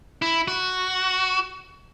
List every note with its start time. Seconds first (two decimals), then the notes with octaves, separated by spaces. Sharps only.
0.22 E4
0.48 F#4